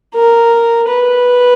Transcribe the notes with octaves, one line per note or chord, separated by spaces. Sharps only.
A#4
B4